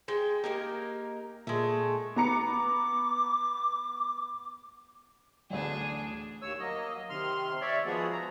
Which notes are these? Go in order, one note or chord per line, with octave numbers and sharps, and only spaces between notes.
G#3 G5
A#3 D#4 G4 A#4
A#2 G#3 A3
B3 A#5 D6 C#7
A1 D2 D4 G#4
D#2 C#5 E6
F#3 A#3 D#5
C3 D#3 C6 F6
C#5 D5 E5
F3 G#3 B3 F#4 G#4
A#5